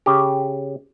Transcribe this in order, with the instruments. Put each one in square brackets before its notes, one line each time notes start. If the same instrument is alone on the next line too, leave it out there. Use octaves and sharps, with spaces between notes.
[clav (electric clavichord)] C#3 G4